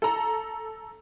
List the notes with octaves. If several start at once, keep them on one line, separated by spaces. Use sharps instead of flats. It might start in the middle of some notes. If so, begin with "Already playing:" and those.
A4 A#5